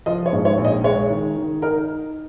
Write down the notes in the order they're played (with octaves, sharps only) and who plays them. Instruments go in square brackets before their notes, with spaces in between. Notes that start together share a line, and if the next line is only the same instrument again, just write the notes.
[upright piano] F3 D#5
C#5
G#2
C#5
A#1
D#5
G#3 C#5
D#3
D#3
D#4 A#4